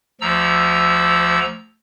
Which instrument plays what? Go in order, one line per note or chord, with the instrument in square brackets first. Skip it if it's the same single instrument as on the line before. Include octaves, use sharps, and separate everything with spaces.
[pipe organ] D2 F3 A#5 E6